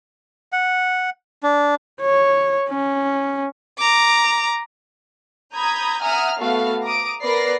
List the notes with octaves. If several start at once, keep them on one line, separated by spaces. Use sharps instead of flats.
F#5
D4
C#5
C#4
A#5 D6
A#5 B5 D#6 G6 G#6
E5 F#5 G#5 A#5 D#6 F6
A3 B3 F#4 A4 F5
A#5 D6 D#6 D7
B3 A#4 B4 D5 A#6 C7